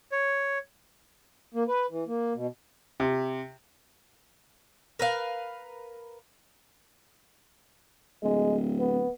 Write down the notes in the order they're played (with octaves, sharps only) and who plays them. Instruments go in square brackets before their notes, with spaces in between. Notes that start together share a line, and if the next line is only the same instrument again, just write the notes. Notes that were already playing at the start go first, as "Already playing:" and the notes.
[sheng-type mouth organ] C#5
[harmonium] A#3
B4
E3
A#3
B2
[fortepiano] C3
[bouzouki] A#4 B4 F5
[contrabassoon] D1 [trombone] G#3
[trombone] B3